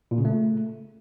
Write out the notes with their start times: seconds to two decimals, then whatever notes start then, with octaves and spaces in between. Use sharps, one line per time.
0.11 A#2
0.18 C#3
0.25 A3